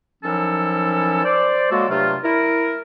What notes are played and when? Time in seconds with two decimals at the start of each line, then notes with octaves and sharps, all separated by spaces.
0.23 D#3 F3 F#3 C#4 E4 A4
1.24 C5 D5
1.71 F#3 G#3 A#3 F#4 A4
1.89 G2 C3 F#3 A3 F4
2.24 E4 A#4